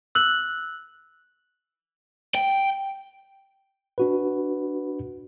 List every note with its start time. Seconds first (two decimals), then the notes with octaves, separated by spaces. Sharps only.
0.15 E6 F#6 F#7
2.35 G5
3.98 D4 F#4 B4